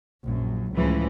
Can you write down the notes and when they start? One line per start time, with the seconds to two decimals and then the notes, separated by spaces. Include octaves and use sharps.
0.25 A#1 F#2
0.75 C#2 A2 C#3 E3 F3